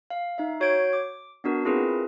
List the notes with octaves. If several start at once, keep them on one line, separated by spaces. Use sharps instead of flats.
F5
D#4 E5
F#4 C#5 G6 G#6 D7
D6
B3 D4 F#4 A#4
C4 E4 F4 G#4 A#4 B4